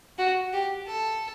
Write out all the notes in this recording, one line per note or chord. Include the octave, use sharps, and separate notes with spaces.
F#4
G4
A4